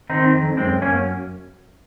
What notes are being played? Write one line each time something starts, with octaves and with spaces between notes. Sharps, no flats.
D#3 C4 D#4
F2
F#2 G#3 C4
F#2 A#3 C#4